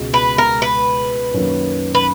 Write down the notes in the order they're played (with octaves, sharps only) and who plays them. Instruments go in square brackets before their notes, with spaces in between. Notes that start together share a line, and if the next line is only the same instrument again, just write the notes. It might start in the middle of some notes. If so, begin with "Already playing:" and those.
Already playing: [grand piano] C#2 B2 G#3
[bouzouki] B4
A#4
B4
[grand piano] F#2 D#3 A#3 C#4
[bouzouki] B4